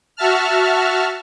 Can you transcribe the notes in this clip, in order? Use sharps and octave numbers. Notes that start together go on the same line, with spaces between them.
F#4 E5 A5 F6